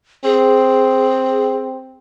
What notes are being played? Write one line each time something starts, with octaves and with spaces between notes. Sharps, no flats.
C4 G#4